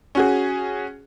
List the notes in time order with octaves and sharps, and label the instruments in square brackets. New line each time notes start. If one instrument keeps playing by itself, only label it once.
[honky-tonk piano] C#4 F#4 G#4